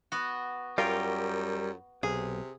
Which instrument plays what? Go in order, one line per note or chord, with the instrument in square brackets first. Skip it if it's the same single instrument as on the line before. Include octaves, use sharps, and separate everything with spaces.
[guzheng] B3 F#4
[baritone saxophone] F#2 [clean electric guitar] G3 A#4 G5 [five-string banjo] F4
[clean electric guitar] B1 [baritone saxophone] C3 [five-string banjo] G#4